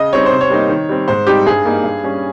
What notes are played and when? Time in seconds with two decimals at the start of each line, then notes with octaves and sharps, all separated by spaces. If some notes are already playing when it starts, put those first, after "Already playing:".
Already playing: C#3 D#5
0.13 G3 C4 D#4 C#5
0.26 C5
0.32 C3
0.41 C#5
0.50 G3 A#3 D#4
0.69 D#3
0.89 G3 C4
1.08 G#2 C5
1.27 G3 C4 D#4 G4
1.46 G2 G#4
1.66 G3 A#3 D#4
1.84 G2
2.04 G3 C#4